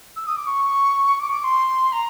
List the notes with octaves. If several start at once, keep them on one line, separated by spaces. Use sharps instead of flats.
E6
D#6
D6
C#6
D6
D6
C6
A#5